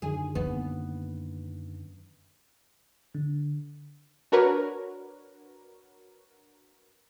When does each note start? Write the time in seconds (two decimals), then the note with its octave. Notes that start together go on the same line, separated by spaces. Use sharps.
0.02 F#2 D3 D#3 G#4
0.35 A#3 B3
3.15 D3
4.32 D4 F#4 A#4 B4 C#5